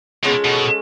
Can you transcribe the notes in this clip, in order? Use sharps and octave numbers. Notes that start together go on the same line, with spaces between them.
B2 G#3 C#4 F4 A4
B2